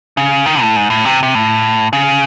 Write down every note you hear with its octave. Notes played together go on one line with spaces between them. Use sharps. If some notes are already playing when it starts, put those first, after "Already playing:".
C#3
D#3
A2
G#2
A2
C3
C3
A2
C#3